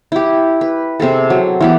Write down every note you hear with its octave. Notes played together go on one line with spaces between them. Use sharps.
E4 G4
B4
C3 C4 G#4 A4
F#3
E3 B3 G4